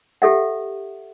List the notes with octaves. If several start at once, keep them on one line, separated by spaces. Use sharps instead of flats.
G4 A4 E5 F#5